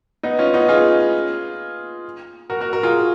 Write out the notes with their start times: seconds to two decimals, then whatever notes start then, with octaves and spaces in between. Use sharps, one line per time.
0.23 B3 D#4
0.39 C#4 F4
0.54 B3 D#4
0.68 F4 G#4
2.50 F#4 A#4
2.61 F#4 A#4
2.73 F#4 A#4
2.83 F4 G#4